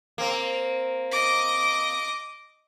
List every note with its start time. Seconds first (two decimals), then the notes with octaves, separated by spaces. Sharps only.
0.18 A#3 C4
1.12 D#5 D6